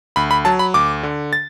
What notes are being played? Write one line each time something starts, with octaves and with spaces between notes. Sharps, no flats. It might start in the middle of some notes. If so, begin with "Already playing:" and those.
D2 B5
B5
F#3 A5
B5
D2 D6
D3
A6